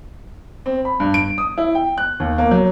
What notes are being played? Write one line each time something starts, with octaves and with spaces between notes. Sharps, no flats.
C4
B5
G2
D7
D#6
E4
G5
F#6
D#2
A#3
F#3